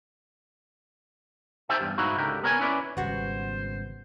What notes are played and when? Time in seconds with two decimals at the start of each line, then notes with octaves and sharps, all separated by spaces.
1.69 D#4 G4 C5 E5 G5 A5
1.81 E2 G2
1.98 G#2 D#4 E4 F#4 F5
2.17 C#2 D3 G4 A#4
2.43 B3 A#4 C#5 E5 G#5
2.59 C#4 E4 B4 D5
2.97 G#1 C#3 G3 B3 F#4 C5